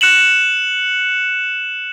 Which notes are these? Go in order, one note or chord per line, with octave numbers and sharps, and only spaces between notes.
F#6 C#7 E7 F#7